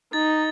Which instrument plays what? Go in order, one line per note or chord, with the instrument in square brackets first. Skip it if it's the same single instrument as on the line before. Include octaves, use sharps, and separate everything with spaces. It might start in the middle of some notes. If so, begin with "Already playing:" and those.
[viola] D#4 [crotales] A6